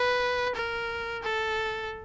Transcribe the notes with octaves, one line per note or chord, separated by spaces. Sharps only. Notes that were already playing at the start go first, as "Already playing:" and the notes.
Already playing: B4
A#4
A4